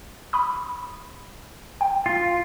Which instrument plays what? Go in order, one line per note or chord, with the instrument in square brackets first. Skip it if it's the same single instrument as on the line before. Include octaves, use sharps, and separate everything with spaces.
[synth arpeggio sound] B5 D#6
G5
[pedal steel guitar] F4